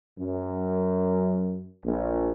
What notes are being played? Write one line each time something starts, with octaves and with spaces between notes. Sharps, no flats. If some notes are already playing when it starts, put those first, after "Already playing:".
F#2
A#1